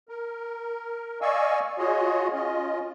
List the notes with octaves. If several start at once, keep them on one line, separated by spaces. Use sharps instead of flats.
A#4
D5 D#5 F5 G#5 C#6 E6
F4 F#4 G#4 C#5 D#5
C#4 F4 D#5